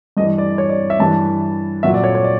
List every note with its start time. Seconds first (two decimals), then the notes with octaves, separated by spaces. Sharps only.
0.17 G2 E3 D#5
0.38 D5
0.58 C#5
0.70 D5
0.90 E5
1.00 G2 E3 A5
1.83 A#2 F#3 E5
1.94 D5
2.04 C#5
2.15 C#5
2.24 D5